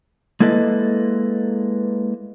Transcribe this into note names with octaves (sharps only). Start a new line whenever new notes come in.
G#3 A#3 E4 A4 B4 D#5